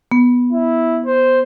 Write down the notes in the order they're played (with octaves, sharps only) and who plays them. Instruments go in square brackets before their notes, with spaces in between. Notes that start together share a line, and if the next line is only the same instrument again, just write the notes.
[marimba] B3
[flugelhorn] E4
C5